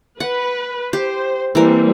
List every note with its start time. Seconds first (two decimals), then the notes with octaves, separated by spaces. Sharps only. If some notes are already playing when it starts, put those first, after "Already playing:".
0.20 B4 F#5
0.93 G4 C5
1.55 E3 G3 A#3 C4 A#4